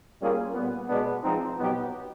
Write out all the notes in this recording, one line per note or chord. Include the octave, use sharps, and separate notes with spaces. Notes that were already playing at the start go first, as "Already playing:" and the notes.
G3 A#3 C#4 F4 G#4
A#2 G3 B3
B2 G#3 B3 D4
F3 G#3 C4 D#4
B2 F#3 B3 D#4 G4